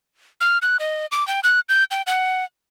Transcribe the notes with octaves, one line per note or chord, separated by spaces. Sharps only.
F6
F#6
D#5
D6
G5
F#6
G6
G5
F#5